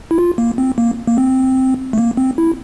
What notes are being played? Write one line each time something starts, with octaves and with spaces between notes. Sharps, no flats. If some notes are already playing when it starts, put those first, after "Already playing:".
E4
F4
A#3
C4
A#3
A#3
C4
A3
A#3
C4
E4